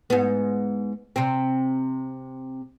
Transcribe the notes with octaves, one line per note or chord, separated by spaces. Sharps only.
G#2 B3
C3 C4